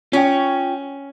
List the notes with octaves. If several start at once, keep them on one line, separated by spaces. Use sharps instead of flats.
C#4 F4 G5